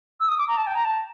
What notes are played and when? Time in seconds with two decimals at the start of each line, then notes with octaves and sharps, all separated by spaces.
0.20 E6
0.28 D#6
0.38 D6
0.48 A#5
0.57 A5
0.67 G5
0.75 A#5
0.85 A5